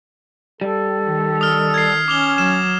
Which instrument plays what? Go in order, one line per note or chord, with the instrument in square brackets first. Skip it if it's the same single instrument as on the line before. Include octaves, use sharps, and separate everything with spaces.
[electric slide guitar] G3 [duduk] A4
[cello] D#3
[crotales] D#6 F6
G#6 C7
[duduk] C#4 [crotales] D6 F7 G7
[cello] F#3 [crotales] E7